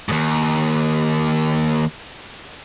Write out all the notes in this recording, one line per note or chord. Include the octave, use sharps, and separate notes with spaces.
D#2 G#2